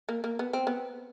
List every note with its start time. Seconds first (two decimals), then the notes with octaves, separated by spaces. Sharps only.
0.09 A#3
0.24 A#3
0.39 B3
0.53 C4
0.67 B3